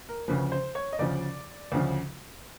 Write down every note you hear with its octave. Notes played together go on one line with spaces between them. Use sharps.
A#4
D2 C#3 F3 B4
C5
C#5
D#5
D2 C#3 F3 D5
D2 C#3 F3